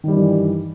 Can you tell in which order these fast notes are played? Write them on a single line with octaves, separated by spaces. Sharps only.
D#3 G3 E3 G2